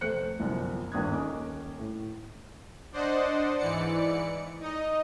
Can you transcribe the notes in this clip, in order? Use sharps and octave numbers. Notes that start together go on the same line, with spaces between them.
F1 A3 C5 F#6 C#7
G1 C2 F#2 F3
D#1 G#1 G2 D#6 F#6 G#6
D#1 D#3 C#4 A#4 D6
A2
D4 C5 D5 D#5 F#5
G#2 E3 D5 C#7
D#4 D#5